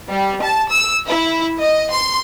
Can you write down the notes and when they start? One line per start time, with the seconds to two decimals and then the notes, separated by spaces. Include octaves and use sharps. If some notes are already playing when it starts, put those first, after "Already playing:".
0.10 G3
0.41 A5
0.70 E6
1.07 E4
1.60 D#5
1.90 C6